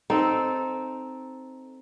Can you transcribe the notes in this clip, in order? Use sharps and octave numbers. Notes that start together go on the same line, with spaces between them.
C4 D#4 A4